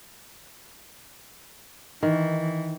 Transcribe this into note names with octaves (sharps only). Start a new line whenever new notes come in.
D#3 E3